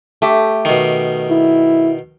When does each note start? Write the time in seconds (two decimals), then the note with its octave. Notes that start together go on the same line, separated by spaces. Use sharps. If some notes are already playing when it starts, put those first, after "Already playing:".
0.22 A3 G4
0.65 B2 D#3
1.30 E4